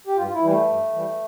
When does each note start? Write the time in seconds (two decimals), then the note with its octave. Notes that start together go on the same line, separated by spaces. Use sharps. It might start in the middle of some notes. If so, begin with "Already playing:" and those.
0.07 G4
0.17 G2 F4
0.28 F4
0.34 E4
0.42 E3 G3
0.50 A3
0.68 G2
0.93 E3 G3